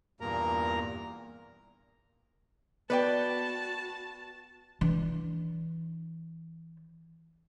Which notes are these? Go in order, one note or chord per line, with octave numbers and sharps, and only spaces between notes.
E2 G2 A#2 A#3 A#4 A#5
B3 F#4 B4 D5 G5 A5
E3 D4